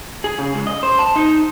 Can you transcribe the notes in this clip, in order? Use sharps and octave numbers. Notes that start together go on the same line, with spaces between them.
G#4
C#3
C#2
D#5
C5
A5
D#4